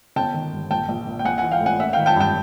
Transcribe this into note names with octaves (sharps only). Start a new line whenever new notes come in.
G1 G5 A5
D#3
G2
A#1 G5 A5
A#1
A#2
G5
A#1 F#5 G#5
E3 F#5 G#5
F5 G5
A2
F#5 G#5
A1 E5 F#5
D#3 F5 G5
G5 A5
G2 G5 A5